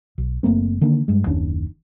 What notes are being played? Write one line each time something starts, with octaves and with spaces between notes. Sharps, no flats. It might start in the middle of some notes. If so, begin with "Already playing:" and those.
B1
F#1 A3 A#3 C4
D3 D#3 A#3 D4
G2 G#3
F#1 D#2 C#4 D4